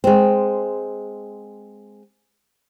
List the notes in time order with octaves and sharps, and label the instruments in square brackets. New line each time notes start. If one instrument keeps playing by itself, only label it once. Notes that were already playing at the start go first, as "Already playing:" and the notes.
[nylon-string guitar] G#3 C4